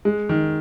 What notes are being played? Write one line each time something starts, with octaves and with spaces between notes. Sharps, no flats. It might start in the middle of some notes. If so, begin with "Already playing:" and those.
G#3
D#3